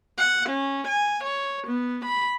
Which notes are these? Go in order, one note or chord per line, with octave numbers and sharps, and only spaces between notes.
F#5
C#4
G#5
C#5
B3
B5